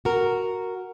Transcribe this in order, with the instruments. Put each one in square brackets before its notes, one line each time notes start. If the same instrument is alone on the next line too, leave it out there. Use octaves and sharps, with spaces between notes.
[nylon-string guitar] F#4 A#4